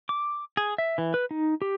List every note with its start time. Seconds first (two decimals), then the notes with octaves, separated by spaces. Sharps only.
0.09 D6
0.57 G#4
0.78 E5
0.98 E3
1.14 B4
1.31 D#4
1.62 G4